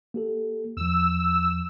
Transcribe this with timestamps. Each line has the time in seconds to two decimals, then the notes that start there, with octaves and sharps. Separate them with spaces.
0.14 A#3 G4 A4
0.77 E2 F3 E6